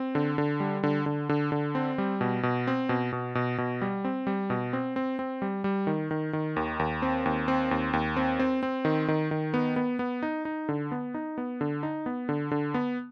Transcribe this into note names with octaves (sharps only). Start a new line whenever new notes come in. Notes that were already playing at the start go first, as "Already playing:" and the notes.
Already playing: C4
D3
D3
G3
D3
D3
D3
D3
C4
G3
B2
B2
C4
B2
B2
B2
B2
G3
C4
G3
B2
C4
C4
C4
G3
G3
D#3
D#3
D#3
D#2
D#2
C4
D#2
C4
D#2
D#2
C4
C4
C4
D#3
D#3
D#3
B3
B3
B3
D#4
D#4
D3
B3
D#4
B3
D3
D#4
B3
D3
D3
B3